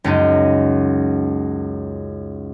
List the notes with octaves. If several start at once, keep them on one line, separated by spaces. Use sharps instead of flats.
C#2 F#2 D#4